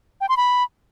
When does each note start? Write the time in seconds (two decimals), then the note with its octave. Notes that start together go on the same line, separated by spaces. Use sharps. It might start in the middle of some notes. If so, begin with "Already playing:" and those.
0.21 G5
0.29 C6
0.37 B5